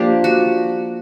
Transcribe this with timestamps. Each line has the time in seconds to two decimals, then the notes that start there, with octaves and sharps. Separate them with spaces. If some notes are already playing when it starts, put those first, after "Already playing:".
Already playing: F3 A#3 D4 G4
0.24 F#4